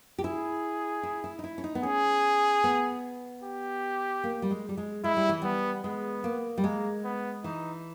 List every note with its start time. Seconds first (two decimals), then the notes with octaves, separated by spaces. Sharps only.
0.19 G4
0.23 E4 G#4
1.03 E4
1.24 E4
1.39 D#4
1.44 E4
1.58 C#4
1.64 D#4
1.75 B3
1.83 C#4 G#4
2.64 B3
3.44 G4
4.24 A#3
4.42 G3
4.50 G#3
4.69 G3
4.78 G#3
5.04 G#3 E4
5.17 G3
5.29 E3
5.42 G3 B3
5.84 G#3 B3
6.24 A#3
6.58 G3
6.64 G#3 A#3
7.04 B3
7.44 E3 D#4